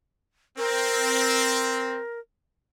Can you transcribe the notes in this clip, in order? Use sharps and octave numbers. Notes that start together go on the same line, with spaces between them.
C4 A#4